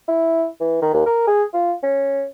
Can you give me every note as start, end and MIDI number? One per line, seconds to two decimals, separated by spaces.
0.08 0.46 64
0.61 0.81 52
0.82 0.91 51
0.94 1.02 39
1.06 1.26 70
1.27 1.44 68
1.54 1.73 65
1.83 2.25 61